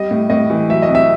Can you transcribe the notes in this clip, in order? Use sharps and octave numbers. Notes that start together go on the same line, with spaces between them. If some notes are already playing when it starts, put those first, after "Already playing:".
Already playing: G3 D#5
A2
A2 D#5
E3
F#3 E5
D#5
C2
E5